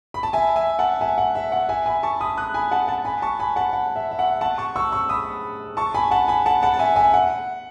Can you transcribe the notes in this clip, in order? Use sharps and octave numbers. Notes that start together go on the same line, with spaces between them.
B5
A5
E5 G#5
E5 G#5
F#5 A5
E5 G#5
F#5
E5
F#5
E5 G#5
G#5 B5
A5 C#6
B5 D#6
D#6 F#6
G#5 B5
F#5 A5
F#5 A5
G#5 B5
A5 C#6
G#5 B5
F#5 A5
F#5
E5
E5
F#5
F#5 A5
A5 C#6
C#6 E6
C#6 E6
B5 D#6
A5 C#6
G#5 B5
F#5 A5
G#5 B5
F#5 A5
F#5 A5
A5
E5 G#5
E5 G#5
F#5